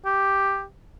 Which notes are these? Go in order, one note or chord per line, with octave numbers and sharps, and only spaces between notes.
G4